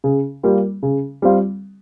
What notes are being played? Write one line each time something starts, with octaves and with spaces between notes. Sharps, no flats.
C#3
G3 A#3 F4
C#3
G3 C4 F4